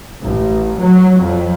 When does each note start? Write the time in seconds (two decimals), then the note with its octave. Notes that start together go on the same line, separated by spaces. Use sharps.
0.23 A1
0.80 F#3
1.20 F2